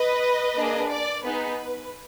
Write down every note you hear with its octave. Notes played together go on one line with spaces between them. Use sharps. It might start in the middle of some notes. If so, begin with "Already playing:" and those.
Already playing: B4 D#5
A#3 D4 G#4
D5
B3 D#4 G#4 B4